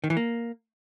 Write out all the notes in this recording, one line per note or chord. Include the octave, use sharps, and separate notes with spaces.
D#3
E3
A#3